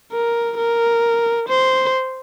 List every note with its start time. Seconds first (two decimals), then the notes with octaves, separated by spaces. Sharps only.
0.12 A#4
0.58 A#4
1.48 C5